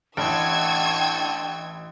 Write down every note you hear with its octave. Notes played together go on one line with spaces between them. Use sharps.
A1 D3 E3 G5 C#6 E6 G#6